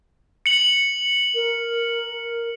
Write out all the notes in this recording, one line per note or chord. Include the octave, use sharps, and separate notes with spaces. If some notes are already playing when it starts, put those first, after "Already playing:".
C#7 F#7
A#4